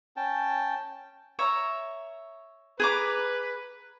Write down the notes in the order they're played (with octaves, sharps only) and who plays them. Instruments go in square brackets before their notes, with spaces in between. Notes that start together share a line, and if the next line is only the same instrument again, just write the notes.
[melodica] C#4 G5 A5
[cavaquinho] C#5 E5 A#5
[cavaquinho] G#4 A#5 D6 [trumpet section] B4